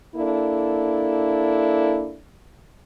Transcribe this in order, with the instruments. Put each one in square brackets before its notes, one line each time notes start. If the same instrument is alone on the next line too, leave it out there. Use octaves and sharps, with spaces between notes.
[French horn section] A#3 D4 E4 A4